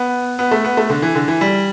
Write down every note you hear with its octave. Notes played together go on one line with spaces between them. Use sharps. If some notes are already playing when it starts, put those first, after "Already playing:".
Already playing: B3
B3
A3
B3
A3
D3
E3
D3
E3
G3